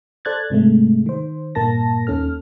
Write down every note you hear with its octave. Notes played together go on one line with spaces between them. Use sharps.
A4 C5 D5 F#6 G#6 A6
G#2 C3 G#3 A3
D#3 C5
G2 A#2 A#3 A#4 A5 A#6
D#2 D#3 C#4 A4 F6